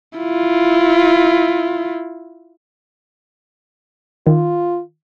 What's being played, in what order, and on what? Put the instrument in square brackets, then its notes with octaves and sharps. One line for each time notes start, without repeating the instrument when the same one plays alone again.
[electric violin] E4 F4
[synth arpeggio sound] D#3 [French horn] F4